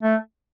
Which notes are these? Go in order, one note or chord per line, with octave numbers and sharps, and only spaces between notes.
A3